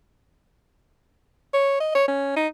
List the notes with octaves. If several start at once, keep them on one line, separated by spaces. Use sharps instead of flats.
C#5
D#5
C#5
C#4
D#4